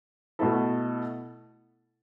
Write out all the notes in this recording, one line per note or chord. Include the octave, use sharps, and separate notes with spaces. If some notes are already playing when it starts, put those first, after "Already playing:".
B2 A3 E4 A4